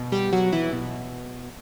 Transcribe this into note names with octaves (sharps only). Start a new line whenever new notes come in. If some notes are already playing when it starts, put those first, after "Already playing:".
Already playing: B2
G3 G4
F#3 F#4
E3 E4
B2